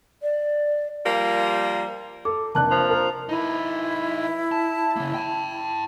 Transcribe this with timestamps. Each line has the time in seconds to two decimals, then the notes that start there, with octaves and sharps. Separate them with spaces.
0.22 D5
1.03 F3 G3 A#3
2.25 A4 D6
2.55 F1 A#3 D4 A5 F#6
2.71 F3
2.90 A#4
3.29 D#4 E4 B4
4.52 A5
4.96 C#3 A#3
5.14 G5 A5